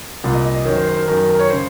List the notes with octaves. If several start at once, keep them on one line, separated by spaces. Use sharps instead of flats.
C2 A#2
D#5
D#5
D#5
F#2 D#3 C#5
C5
C5
A#4
F#2 D#3 A#4
A#4
A#4
C#5
C#3 C5